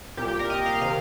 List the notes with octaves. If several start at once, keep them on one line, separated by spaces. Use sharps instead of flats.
C2 A#2 G4
G4
A#4
D#5
F5
C3 D#3 F5